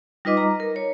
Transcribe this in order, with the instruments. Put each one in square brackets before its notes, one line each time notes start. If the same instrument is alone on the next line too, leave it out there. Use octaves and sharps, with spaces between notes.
[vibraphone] G3 D#4 F4 B4 D#5 D6
A#5
A#4
C#5